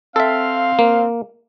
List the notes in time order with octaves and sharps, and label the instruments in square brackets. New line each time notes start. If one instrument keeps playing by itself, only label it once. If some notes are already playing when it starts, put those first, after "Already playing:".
[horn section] C4 F5 [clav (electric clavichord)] A4 E5
[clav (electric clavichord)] A#3